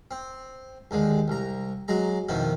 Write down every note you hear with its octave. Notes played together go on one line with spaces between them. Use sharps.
C4
D#2 D3 G#3
C2 A#5
F#3 G#3 A#5
F2 B2 D#3 B3 E4